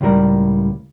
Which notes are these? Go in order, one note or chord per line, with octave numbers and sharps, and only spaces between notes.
C#2 A2 G3 A#4